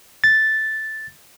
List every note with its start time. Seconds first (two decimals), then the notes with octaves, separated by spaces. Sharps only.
0.24 A6